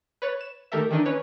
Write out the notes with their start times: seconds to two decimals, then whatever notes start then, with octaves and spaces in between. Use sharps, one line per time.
0.22 B4 C#5 A6
0.41 E7
0.72 D#3 A3 G4 A4 A#4 E5
0.91 D#3 E3 D4 D#4
1.06 C#4 B4 C#5